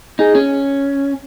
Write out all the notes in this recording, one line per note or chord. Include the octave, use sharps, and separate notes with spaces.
D#4 G#4
C#4